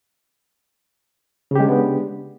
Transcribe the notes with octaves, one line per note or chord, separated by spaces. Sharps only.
C#3 G#3 B3 D4 G4